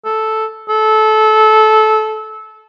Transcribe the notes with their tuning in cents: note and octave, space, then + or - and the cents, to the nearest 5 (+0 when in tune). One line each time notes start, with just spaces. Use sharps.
A4 -5
A4 -20